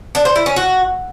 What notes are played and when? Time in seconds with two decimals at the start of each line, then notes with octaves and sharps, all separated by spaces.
0.15 D4
0.25 C5
0.36 E4
0.46 C#4
0.56 F#4